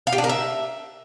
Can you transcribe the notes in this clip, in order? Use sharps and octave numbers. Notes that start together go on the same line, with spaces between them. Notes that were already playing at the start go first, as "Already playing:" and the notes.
F5
G4
D4
A#4
E5